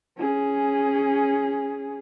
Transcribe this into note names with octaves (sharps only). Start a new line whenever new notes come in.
C#4 G#4